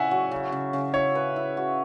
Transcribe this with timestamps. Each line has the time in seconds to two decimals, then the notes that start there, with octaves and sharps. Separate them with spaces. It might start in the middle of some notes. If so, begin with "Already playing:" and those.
Already playing: C#3 E4 E5 F#5 G#5
0.11 F#3
0.31 C#3
0.52 C#3
0.73 C#3
0.94 E4 C#5
1.15 B4
1.36 E4
1.57 F#4